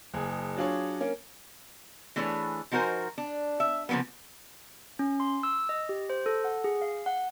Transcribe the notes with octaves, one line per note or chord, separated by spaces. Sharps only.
F#1 G#4
F#3 D4 F4 G#4 C#5
A#3 C#4
E3 A3 D4 G#4 B4 C#5
F3 D#4 F#4 A#4 C5 G#5
D4
E5
C#3 F3 G#3 A#3 B3
C#4
C6
E6
D#5
G4
C5
A4
F#5
G#4
F5
F#5